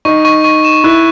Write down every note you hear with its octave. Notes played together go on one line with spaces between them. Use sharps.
D#4 C#6
C#6
C#6
E7
E4 F#6